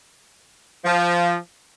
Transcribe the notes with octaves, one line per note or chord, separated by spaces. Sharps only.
F3